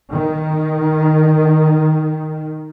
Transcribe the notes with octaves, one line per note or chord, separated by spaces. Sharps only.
D#3